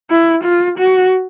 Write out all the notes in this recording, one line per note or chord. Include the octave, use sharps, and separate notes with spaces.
E4
F4
F#4